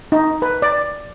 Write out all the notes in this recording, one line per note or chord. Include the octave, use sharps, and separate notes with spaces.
D#4
B4
D5